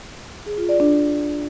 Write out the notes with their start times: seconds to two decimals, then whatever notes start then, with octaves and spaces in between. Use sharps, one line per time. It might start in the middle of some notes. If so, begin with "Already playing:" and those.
0.46 G#4
0.58 F4
0.69 D5
0.80 D4